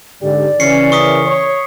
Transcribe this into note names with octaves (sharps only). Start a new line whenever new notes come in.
G#2 D3 G4 D5
C#3 E3 C#4 C7 C#7
A#4 C#6 D#6 B6
C#5